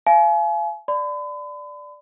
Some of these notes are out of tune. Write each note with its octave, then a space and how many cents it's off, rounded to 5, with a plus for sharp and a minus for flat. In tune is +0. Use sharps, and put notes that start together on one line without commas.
F5 -30 G#5 +40
D5 +0 B5 +40